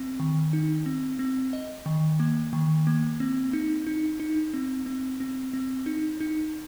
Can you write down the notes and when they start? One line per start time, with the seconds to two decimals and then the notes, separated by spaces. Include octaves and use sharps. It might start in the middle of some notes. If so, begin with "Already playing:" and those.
Already playing: C4
0.20 D#3
0.53 D#4
0.86 C4
1.19 C4
1.53 D#5
1.86 D#3
2.20 A#3
2.53 D#3
2.87 A#3
3.20 C4
3.53 D#4
3.87 D#4
4.20 D#4
4.54 C4
4.86 C4
5.20 C4
5.53 C4
5.86 D#4
6.20 D#4